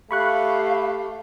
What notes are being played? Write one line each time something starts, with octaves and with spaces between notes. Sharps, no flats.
A3 G4 F5 B5 C#6 F#6